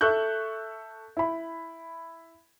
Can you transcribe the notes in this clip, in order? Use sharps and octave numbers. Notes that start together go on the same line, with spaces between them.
A4 E5 C#6 F#6 G6
E4 B5